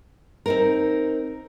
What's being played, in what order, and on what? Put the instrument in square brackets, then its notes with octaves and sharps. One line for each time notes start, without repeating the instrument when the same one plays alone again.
[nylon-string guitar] C4 D#4 A#4